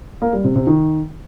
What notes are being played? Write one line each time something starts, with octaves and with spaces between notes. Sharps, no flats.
A#3
G3
C3
C3
D#3